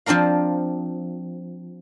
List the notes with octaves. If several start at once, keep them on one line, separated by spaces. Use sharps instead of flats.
F3 C4 D4 A#4 F5